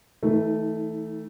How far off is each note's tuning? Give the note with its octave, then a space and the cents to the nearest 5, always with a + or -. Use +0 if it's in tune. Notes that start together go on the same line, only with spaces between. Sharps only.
E3 -40 A3 +0 D#4 +25